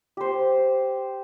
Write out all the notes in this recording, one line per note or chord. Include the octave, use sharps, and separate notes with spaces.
G4 C5